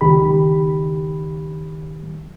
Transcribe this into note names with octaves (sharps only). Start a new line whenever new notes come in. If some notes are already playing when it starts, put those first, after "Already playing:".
C#2 D#3 G4 B5